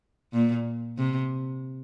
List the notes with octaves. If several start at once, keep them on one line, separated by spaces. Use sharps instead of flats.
A#2
C3